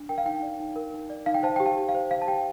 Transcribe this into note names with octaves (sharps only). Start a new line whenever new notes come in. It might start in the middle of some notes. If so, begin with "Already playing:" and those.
Already playing: D4
A#4 G5
F5
D#4 G5
D5
D#4
A#4
D#4
D5
D#4 F5
G5
C5 F5 A5
G4 G5
F5 A5
G4
F5
C5
C5 F5
A5
G4 G5